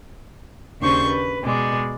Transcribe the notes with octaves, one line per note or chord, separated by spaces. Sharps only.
D#2 C#3 D4 C5 C#6 G6
B4
B2 G#3 D5